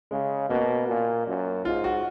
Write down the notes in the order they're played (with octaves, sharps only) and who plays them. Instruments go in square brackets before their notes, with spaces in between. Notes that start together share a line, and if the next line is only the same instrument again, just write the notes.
[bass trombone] C#3 [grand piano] G#3
[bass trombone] B2 [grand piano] A#3
[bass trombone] A#2
F#2
[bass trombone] G#2 [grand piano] F4
[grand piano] F#4